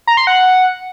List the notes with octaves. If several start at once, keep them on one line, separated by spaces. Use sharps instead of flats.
A#5
C6
F#5